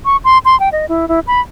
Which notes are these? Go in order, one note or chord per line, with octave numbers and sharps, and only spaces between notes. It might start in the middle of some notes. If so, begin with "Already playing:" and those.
C#6
C6
C6
G5
D#5
E4
E4
B5